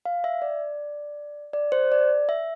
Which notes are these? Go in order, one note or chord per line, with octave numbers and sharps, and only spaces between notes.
F5
E5
D5
D5
C5
D5
E5